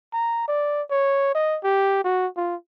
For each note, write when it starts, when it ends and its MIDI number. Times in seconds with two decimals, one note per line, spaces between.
0.13 0.44 82
0.48 0.82 74
0.91 1.33 73
1.35 1.58 75
1.64 2.02 67
2.04 2.27 66
2.37 2.55 65